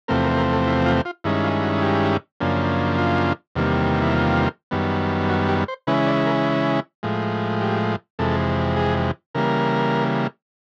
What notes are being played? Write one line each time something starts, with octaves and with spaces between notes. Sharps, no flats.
E2 C3 F3 A3 C4 A#4
A#4
A#4
A4
E4
F4
F4
G2 D#3 G#3 C#4 E4
F4
F#4
G4
F#2 C#3 F3 A#3 D4
F4
E2 C3 D#3 G3 A#3
E4
F4
F#2 D#3 G3 B3
F#4
G4
C5
C#3 E3 G#3 C#4 E4 B4
D5
A#4
A2 F3 G#3
G4
F2 C3 E3 G#3 A4
G#4
C#3 E3 G3 A#3 A#4